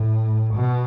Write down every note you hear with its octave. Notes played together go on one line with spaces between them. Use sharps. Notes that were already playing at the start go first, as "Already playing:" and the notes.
Already playing: A2
B2